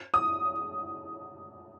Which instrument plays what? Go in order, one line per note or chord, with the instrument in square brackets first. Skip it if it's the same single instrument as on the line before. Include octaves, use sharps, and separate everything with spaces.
[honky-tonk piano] D#6